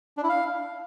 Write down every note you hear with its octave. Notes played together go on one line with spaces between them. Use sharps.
D4
E4
F5